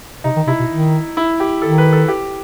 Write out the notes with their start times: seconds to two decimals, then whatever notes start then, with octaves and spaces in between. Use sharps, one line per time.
0.24 C3 D#4
0.36 D#3
0.47 C3 E4
0.60 B2
0.71 D#3
1.17 E4
1.40 G4
1.62 D#3 A4
1.78 B4
1.93 A4
2.08 G4